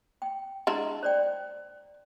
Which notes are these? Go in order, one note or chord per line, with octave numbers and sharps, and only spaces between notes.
G5
G#3 D4 E4 A#5 C6
C5 D5 G5